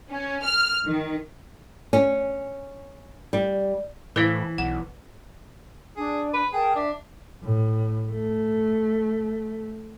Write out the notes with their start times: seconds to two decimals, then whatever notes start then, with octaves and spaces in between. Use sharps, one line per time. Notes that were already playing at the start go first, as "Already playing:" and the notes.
0.10 C#4
0.44 F6
0.85 D#3
1.93 C#4
3.33 G3
4.16 A2 E3 B4 C5 E5 F5
4.58 B1 F#5
5.96 D4 G#4
6.33 B4
6.53 G#4 A#4 G5 A5
6.75 D4 E5
7.43 A2
8.12 A3